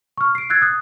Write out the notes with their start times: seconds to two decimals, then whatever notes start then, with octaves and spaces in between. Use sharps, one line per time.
0.18 C#6 F6
0.35 C7 D7
0.50 E6 F#6 G#6 A6 C7
0.62 D#6 F#6